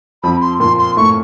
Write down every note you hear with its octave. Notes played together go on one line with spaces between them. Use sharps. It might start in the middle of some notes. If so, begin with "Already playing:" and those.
F2 F3 B5
C6
A#2 A#3 C6
C6
A2 A3 C#6